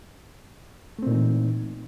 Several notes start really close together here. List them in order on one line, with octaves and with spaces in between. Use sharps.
A3 C4 A#2 D#4 E3